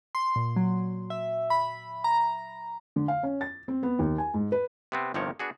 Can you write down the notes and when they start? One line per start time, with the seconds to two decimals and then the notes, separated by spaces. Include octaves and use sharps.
0.15 C6
0.36 A#2
0.56 F#3
1.10 E5
1.50 B5
2.04 A#5
2.96 D3
3.08 F5
3.23 C#4
3.41 A6
3.68 C4
3.83 B3
3.99 D#2
4.18 G#5
4.34 G#2
4.52 B4
4.92 C3 B3 C4
5.14 G1 C3 D#3 F3 A#4 C#5
5.39 B3 D4 F#4 G#4